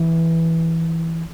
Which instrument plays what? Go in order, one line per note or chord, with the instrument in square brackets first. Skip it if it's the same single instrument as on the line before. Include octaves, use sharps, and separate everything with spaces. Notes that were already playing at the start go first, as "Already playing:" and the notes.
Already playing: [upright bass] E3